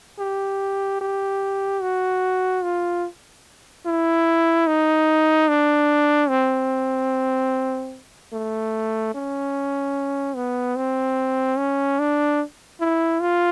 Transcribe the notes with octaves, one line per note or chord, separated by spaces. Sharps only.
G4
G4
F#4
F4
E4
D#4
D4
C4
A3
C#4
B3
C4
C#4
D4
E4
F4